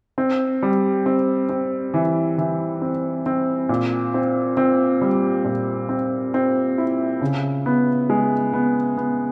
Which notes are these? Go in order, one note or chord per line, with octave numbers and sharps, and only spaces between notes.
C4
G3
C4
C4
E3
E3
C4
C4
A#2
C4
C4
G3
A#2
C4
C4
E4
C#3
B3
G#3
B3
B3